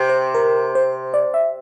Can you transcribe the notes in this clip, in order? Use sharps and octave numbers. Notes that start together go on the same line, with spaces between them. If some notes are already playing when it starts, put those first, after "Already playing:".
Already playing: C3
C5
A#4
C5
D5
E5